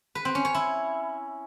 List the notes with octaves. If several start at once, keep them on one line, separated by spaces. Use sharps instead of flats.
B4
C4
C#4
C#5
E4